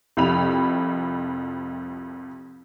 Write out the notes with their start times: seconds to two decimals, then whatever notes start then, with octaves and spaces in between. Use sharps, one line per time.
0.17 C2 F2 E4 B5 F7